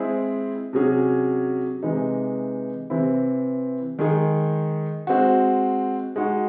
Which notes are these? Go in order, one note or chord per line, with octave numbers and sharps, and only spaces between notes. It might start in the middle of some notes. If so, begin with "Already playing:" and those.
Already playing: G#3 C4 E4 G#4
C3 F#3 C#4 G#4
C3 E3 G#3 D#4
C3 E3 C4 E4
D#3 G#3 D#4 G#4
G#3 C4 F#4
G#3 D#4 F#4